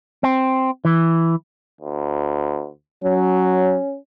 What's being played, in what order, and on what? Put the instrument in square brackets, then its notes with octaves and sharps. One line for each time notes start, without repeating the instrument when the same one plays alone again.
[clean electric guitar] C4
E3
[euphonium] D2
[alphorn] F#3 [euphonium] C#4